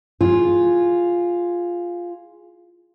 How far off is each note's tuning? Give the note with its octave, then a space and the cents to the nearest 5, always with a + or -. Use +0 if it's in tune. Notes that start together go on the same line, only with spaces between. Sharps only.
F4 +0 G#4 +0